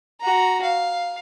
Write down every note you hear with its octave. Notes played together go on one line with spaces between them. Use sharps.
F#4 A#5
F5